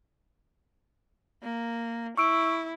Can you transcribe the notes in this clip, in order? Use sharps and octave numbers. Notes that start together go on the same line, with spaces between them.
A#3
E4 C#6 E6 D7